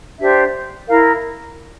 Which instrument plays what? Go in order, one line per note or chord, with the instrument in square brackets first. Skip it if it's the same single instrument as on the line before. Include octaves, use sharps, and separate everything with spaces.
[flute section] D4 G4 C5 E5
E4 A#4 F5